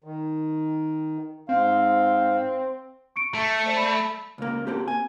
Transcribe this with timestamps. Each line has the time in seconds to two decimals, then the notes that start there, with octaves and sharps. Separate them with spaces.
0.04 D#3
1.49 G#2 C4 F5
3.16 C#6 C#7 D7
3.35 A3
3.65 C5 D5
3.77 B5
4.38 C#2 A#3
4.67 A#3 C4 G4
4.88 G#5